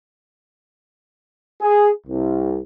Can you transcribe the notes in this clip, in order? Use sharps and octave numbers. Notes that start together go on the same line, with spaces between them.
G#4
C2